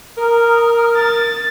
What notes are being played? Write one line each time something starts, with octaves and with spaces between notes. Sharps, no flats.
A#4 A#5 D#6 F6
A6